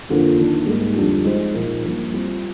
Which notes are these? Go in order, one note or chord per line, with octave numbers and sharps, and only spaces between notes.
F2 D3 F3 A#3 F4
D#3 A#3 D4
G#2 G3 A#3 D#4 G#4
F2 D3 G3 D4 F4
G#3 D#4 G#4 C5
A#2 F3 A#3 D#4
G2 F3 A#3
G3 C4 F4